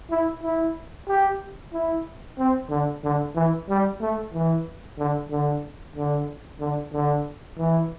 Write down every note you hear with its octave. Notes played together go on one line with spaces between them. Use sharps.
E4
E4
G4
E4
C4
D3
D3
E3
G3
A3
E3
D3
D3
D3
D3
D3
E3